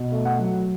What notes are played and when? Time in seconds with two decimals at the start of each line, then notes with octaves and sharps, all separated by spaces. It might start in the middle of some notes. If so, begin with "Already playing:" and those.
Already playing: B2
0.12 A3
0.25 F#5
0.39 F#3